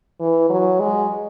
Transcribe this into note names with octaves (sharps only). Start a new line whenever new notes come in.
E3
F#3
G#3